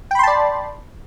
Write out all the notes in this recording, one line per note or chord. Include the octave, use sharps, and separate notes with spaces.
D5 G5 A5 B5 C6